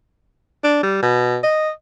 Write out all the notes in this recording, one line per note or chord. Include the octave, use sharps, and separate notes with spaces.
D4
G3
B2
D#5